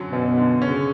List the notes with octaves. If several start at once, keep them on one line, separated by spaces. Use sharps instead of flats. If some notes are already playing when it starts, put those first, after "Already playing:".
Already playing: F#2 D3 F#3 C#4
F#2 B2
D3
C#3 C#4